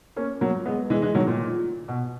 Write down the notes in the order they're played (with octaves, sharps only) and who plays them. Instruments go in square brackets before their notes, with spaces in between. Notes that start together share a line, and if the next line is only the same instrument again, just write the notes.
[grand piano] A#3 C#4
F#3 A#3
G#3 B3
E3 G#3
E3 G#3
D#3 F#3
A#2
B2